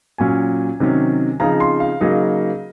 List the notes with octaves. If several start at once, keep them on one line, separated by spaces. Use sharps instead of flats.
A#2 F#3 C#4 G#5
C3 D#3 F#3 C#4
C#3 F3 C4 D#4 A#5
C6
F5
C#3 F#3 A#3 D#4 D#5